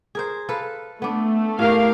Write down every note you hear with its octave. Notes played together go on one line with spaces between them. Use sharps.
G#4 A#4 C5
A4 B4 F5
A3 B3 D4
A2 C#4 G4 A#4 F5